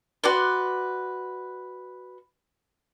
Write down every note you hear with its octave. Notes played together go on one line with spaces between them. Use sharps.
F#4 B4 D5 C6